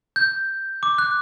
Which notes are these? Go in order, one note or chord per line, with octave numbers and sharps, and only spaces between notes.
G6
D6
F#6